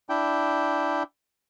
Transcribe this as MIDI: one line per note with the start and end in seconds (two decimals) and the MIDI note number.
0.09 1.03 62
0.09 1.03 64
0.09 1.03 79